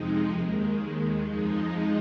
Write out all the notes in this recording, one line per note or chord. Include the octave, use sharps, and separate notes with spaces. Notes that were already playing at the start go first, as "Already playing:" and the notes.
Already playing: F2 C3 F3 G#3 D#4
D#2 D#3 G#3
D#2 D#3 G#3
F2 F3 G#3 D#4